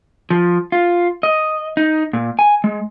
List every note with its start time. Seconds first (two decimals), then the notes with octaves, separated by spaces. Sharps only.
0.30 F3
0.72 F4
1.23 D#5
1.77 D#4
2.13 A#2
2.39 G#5
2.64 G#3